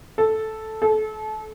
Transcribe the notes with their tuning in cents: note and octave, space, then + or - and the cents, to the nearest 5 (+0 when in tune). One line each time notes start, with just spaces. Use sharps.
A4 -5
A4 -30